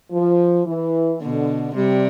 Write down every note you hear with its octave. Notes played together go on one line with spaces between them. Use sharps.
F3
E3
B2 D3
C3 G3